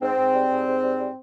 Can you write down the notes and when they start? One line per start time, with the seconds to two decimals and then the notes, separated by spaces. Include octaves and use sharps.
0.02 G#2 C4
0.18 G#2
0.35 G3
0.50 G#2
0.67 G#2
0.83 G3
0.99 G3